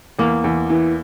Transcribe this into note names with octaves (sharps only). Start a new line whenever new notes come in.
E2 A#3
E2
E3